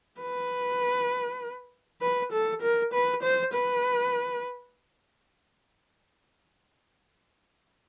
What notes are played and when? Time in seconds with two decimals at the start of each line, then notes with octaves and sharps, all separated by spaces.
0.21 B4
2.01 B4
2.32 A4
2.61 A#4
2.93 B4
3.22 C5
3.53 B4